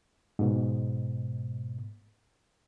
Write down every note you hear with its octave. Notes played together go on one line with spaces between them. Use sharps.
G#2 B2